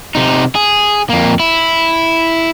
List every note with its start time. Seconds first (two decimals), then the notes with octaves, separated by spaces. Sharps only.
0.15 C3 D#4
0.55 G#4
1.10 F2 A#3
1.40 E4